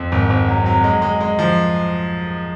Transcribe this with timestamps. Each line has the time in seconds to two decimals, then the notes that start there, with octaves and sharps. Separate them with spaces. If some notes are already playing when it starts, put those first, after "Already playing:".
Already playing: F2
0.12 G#1
0.30 G#1
0.48 F#3
0.66 F#3
0.84 G#3
1.02 G#3
1.21 G#3
1.39 F3